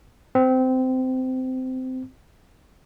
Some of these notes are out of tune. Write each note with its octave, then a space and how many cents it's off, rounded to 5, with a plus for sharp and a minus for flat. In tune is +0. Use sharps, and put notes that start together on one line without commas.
C4 -20